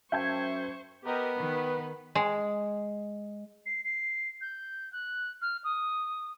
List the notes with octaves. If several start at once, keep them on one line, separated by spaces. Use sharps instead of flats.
F#2 C5 E5 G5 A5 C#6 G6 G#6
B3 G4 A#4 D#5
D#3 B4
G#3
C7
C7
G6
F#6
F6
D#6